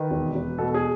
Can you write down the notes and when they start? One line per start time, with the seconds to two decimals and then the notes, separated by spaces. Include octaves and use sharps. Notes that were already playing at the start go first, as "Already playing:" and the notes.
Already playing: D#3 B4
0.11 E1
0.35 E1
0.58 B2 A4
0.74 G#4